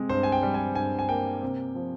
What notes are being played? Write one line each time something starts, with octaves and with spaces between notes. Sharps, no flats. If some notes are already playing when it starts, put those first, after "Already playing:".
Already playing: C3 G#3
G2 C5
G#5
G5
G3
G#5
G2 G#5
G#5
A#3 G5
C3
F3